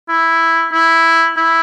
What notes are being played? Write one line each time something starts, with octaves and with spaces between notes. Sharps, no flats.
E4
E4
E4